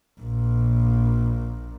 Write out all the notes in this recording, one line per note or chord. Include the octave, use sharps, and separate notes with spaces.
A#1 A#2